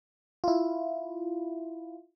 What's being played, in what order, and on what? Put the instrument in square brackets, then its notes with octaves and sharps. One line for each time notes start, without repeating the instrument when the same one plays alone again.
[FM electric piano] E4 F4